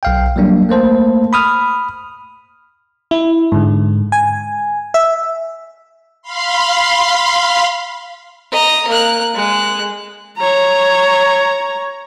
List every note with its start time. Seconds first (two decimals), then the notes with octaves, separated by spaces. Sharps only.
0.03 B1 F5 G5
0.36 F#3 G3 A#3 D4
0.69 A3 A#3 C5 A5
1.33 B5 D#6 F6
3.11 E4
3.52 G#2 D3
4.12 G#5
4.94 E5
6.22 F5 B5 C6
8.52 D#5 A#5
8.88 A#3 F#6
9.35 G#3 F#6
10.38 C#5 A#5